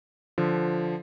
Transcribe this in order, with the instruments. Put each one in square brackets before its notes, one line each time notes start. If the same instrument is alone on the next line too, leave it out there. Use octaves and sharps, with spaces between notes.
[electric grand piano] D3 F3